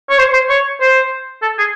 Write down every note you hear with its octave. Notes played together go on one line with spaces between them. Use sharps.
C#5
C5
C5
C#5
C5
A4
G#4